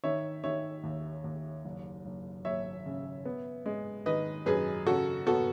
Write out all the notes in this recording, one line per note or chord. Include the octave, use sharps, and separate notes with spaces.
D#3 C#5 E5
D#3 C#5 E5
D#2
D#2
F#1
F#1
F#1 C#5 E5
C#3
B3
G#3
D#3 B4 D#5
F#2 G#4 B4
C#3 F#4 A4
B3 F#4 A4